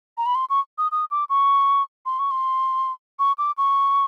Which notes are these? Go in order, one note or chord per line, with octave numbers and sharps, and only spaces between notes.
A#5
B5
C6
C#6
D#6
D#6
D6
C#6
C6
C#6
C6
C#6
D6
C#6